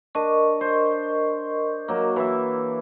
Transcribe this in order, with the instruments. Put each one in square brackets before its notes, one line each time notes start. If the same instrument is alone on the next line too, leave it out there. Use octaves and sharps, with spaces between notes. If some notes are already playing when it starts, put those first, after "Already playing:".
[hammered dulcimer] D4 [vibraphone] A#4 D#5 C#6
[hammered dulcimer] C5
F#3 A#3
E3 E5